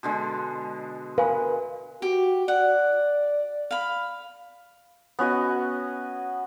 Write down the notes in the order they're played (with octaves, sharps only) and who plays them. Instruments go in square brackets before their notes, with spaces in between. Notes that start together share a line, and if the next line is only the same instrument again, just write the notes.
[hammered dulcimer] B2 D3 G#3
[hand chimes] A#4 [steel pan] B4 [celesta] F5 G#5
[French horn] F#4 [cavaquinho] G4
[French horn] D5 [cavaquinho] F#5
[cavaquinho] F5 B5
[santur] B3 C#4 F#4 D#5